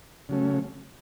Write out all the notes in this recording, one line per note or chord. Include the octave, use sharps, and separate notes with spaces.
C#3 F#3 A3 C#4